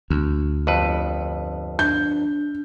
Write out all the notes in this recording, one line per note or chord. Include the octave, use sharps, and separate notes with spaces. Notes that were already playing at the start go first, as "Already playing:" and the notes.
D2
G1 F2 B4
D4 G6